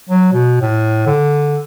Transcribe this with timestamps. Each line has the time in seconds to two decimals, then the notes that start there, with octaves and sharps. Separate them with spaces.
0.10 F#3
0.33 B2
0.61 A2
1.06 D3